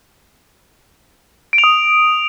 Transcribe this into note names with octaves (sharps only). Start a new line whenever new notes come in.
D7
F7
D#6